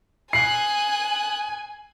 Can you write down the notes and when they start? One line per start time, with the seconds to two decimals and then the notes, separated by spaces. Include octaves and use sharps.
0.33 G#5 D#6 F#6 C7